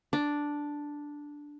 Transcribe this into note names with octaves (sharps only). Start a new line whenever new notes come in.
D4